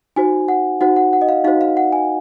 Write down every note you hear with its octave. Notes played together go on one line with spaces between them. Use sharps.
D#4 F#4 C5 G#5
F#5
D#4 F#4 C5 F#5
F#5
F#5
D#5
F5
D#4 F#4 C5 F5
F5
F#5
G#5